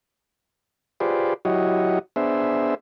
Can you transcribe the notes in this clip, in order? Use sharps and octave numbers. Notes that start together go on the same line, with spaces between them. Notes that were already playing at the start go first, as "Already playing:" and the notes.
F4 G4 G#4 B4 C5 D5
F#3 E4 F#4 G4 C#5 D#5
B3 D4 G#4 C5 E5